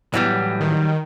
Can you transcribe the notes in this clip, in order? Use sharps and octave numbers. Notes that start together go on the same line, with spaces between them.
A2 E3 F#3 G3 B3
D#3